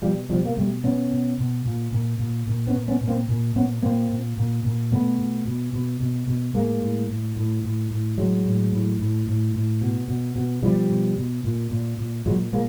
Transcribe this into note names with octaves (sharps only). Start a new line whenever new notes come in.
B2 F3 G3
B2 F3 G3
A#3
B2 G3 A3
B2 B3 C#4
B2
B2
A#2
A#2
A#2
A#2
B3 C#4
A#2
B3 C#4
A#2
A#3 C4
A#2
A#2 B3 C#4
A#2 A#3 C4
A#2
A#2
A#2
B2 A3 B3
B2
B2
B2
B2
B2
A2 G#3 A#3
A2
A2
A2
A2
A2
A2 F#3 G#3
A2
A2
A2
A2
A2
B2
B2
B2
B2 F3 G3
B2
B2
A#2
A#2
A#2
A#2 F#3 G#3
A#2 G#3 A#3